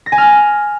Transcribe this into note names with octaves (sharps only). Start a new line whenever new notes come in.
A#6
G#5
F6